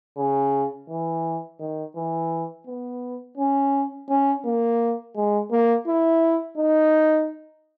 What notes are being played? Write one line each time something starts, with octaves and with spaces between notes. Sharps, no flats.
C#3
E3
D#3
E3
B3
C#4
C#4
A#3
G#3
A#3
E4
D#4